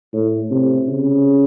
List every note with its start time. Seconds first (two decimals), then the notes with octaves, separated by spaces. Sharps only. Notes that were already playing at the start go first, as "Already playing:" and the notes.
0.13 A2
0.51 C3
0.88 C#3